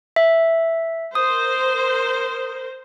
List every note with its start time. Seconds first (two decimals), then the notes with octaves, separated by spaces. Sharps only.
0.16 E5
1.15 A#4 C5 D#6